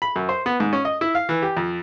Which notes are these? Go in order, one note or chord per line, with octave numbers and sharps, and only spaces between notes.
B5
F#2
C5
B3
G#2
C#4
D#5
E4
F5
E3
G4
F2